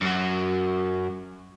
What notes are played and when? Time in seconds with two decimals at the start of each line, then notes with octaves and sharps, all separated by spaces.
0.01 F#2 F#3